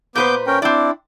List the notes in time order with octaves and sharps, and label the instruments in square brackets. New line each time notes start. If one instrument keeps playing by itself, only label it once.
[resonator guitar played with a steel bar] A#2 B4 C5 [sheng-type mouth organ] B3 D6 G6
[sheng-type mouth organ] C#4 A#4 G5
[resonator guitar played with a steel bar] C4 D5 [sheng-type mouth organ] D4 E4